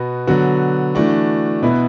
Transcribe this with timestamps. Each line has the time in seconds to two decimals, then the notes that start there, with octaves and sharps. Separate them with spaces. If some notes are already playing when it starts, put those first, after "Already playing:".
Already playing: B2 B3 F#4
0.27 D3 F#3 B3 F#4
0.95 E3 A3 D4 F#4
1.62 B2 B3 E4